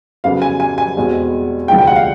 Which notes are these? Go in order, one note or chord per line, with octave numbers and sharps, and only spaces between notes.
F2 C#3 F#3 B3 F5
G#5
G#5
G#5
E2 B2 G#3 C4
D2 C3 F3 G#3 B3 G5
G5
F#5
F5